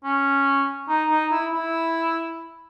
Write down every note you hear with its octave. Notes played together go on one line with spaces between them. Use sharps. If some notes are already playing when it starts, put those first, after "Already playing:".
C#4
D#4
D#4
E4
E4